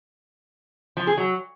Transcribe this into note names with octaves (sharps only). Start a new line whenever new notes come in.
F3
G#4
F#3